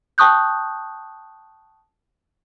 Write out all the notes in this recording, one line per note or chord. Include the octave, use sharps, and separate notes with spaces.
G5 A5 C#6 D#6 F#6 G6